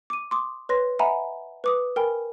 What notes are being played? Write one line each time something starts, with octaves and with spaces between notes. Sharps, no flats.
D6 D#7
C6 D6 D#6
B4 C#5 C6 A#6
D#5 E5 F#5 G#5 A#5 B5
B4 D6 D#6
A#4 G5 G#5 B5